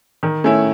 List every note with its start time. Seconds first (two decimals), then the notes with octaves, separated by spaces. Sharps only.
0.23 D#3
0.44 A3 C#4 E4